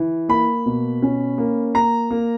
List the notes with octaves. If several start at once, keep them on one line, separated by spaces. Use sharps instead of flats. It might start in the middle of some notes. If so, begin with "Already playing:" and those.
Already playing: E3
A#3 B5
B2
C#4
A#3
A#3 A#5
A#3